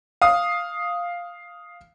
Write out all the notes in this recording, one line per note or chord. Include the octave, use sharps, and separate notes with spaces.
F5 D#6